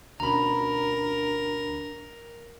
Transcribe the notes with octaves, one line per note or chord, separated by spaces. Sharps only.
D2 B2 C#4 D4 A#4 A#5 B5